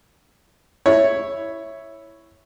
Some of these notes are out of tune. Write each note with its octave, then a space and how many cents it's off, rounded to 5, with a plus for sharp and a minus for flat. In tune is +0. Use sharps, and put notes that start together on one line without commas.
E4 +0 C#5 +0